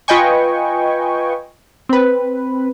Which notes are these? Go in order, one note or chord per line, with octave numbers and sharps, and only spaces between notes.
F4 B4 D#5 G5 G#5 C#6
C4 B4